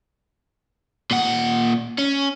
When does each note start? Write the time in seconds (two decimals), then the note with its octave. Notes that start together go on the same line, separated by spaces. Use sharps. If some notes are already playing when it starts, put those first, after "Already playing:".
1.11 A#2 F#5
1.99 C#4